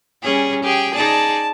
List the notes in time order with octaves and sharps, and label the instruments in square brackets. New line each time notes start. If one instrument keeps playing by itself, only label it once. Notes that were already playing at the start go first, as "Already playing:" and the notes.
[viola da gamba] G3 C#4 G#4
[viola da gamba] G4 [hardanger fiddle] G#4 G5
[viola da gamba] D#4 G#4 D5 [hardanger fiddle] A5